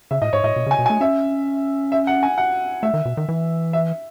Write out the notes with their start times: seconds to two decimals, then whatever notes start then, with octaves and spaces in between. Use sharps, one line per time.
0.11 C#3 E5
0.22 A2 D#5
0.33 G#2 C#5
0.44 A2 D#5
0.56 B2
0.66 C#3
0.71 G#5
0.79 B2
0.86 G#5
0.90 A3
1.01 C#4 E5
1.92 E5
2.07 F#5
2.23 G#5
2.38 F#5
2.83 A3 E5
2.94 D#3
3.05 B2
3.17 D#3
3.29 E3
3.73 E5